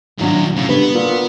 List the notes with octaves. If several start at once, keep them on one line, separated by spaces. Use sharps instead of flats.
D#2 A#2 E3 F#3 D4
A2 C#3
G1 B3 B4
A#2